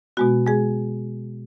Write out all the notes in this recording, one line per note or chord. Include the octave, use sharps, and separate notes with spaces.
B2 G#3 B3 F#4
G#3 G#4